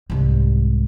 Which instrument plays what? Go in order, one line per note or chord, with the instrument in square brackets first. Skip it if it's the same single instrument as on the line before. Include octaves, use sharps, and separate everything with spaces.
[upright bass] C2 G#2